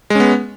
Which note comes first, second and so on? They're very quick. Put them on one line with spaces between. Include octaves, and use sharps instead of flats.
G#3 C#4 B3